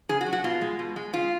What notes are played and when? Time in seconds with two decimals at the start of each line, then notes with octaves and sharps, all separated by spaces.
0.09 C#3 G#4
0.21 F#4
0.26 F#3
0.33 F#4
0.44 B2 F4
0.61 G#3
0.79 B2
0.96 G#3
1.13 C#3 F4